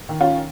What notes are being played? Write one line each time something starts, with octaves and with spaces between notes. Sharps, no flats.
D#3
C#4 F4